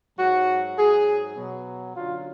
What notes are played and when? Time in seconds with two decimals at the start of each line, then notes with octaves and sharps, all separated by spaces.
0.19 G#2 F#3 F#4
0.78 G#2 F#3 G#4
1.36 B2 F#3
1.95 F#2 D3 F#3 F4